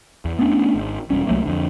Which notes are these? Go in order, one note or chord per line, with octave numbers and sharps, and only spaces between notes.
E2
A3 B3 C#4 D4
G#1
E1 G2 G3 C#4
C2 F#3 A3 A#3
F2 D3